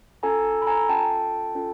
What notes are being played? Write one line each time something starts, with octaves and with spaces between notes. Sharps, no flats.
C#4 F4 A4 G#5 A#5
B5
G#5 A#5
C#4 F4 A4 G5 A5
C#4 F4 A4